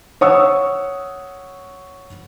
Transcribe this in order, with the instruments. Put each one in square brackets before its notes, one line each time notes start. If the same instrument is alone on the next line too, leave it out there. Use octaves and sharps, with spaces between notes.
[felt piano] C#5 F#5 C#6 D#6 E6